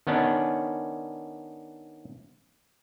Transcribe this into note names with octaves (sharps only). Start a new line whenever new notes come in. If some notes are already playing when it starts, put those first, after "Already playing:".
D#3 B3 C#4 D4